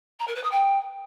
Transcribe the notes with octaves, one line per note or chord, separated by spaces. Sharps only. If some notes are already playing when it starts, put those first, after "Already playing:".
A#5
A#4
B4
D#6
G5